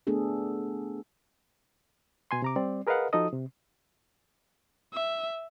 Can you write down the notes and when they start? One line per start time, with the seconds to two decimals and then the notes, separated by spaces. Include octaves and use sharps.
0.07 A3 B3 D4 G#4 A4
2.31 B2 G#5 C6
2.42 C3 A#5 D6
2.56 G3 C4 D5
2.87 G#4 A#4 B4 D#5 F5 F#5
3.13 F3 D#4 F#4 A4 D#5 D#6
3.33 C3
4.93 E5